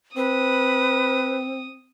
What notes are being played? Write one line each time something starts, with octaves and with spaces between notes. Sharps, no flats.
C4 B4 D#6